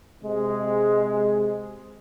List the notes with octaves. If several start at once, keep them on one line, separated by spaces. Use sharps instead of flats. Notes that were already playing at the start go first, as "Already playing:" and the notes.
C3 G#3